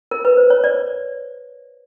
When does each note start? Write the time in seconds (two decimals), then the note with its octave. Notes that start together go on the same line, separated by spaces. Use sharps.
0.11 A#4
0.25 B4
0.37 C5
0.50 C#5
0.64 D5